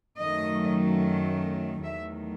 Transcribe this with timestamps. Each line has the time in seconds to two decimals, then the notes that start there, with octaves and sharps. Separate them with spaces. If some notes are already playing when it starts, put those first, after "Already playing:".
0.19 F#2 D#3 F#3 A3 D#5
1.83 E2 D#3 F#3 A3 E5